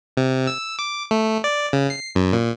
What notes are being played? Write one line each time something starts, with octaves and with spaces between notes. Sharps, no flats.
C3
E6
D6
A3
D5
C#3
C7
F#2
A#2